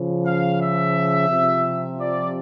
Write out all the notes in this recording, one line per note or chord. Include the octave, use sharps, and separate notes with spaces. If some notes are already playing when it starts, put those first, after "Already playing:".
Already playing: C#3 F3
F5
E5
C3 F3
D5